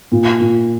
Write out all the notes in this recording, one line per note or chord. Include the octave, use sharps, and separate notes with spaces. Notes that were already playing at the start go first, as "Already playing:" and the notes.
A#2
A#2